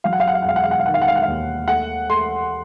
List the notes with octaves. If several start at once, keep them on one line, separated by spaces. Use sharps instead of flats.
F#3 F5
F#5
F5
F#5
F5
F#5
E1 F5
F#5
F5
F#5
F5
D#3 F#5
F5
F#5
F5
F#5
D#2 F5
A3 F#5
A3 C6